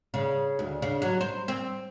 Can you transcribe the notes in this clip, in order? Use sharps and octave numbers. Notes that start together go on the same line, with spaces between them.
C#3
D2
C#3
F#3
C5
C4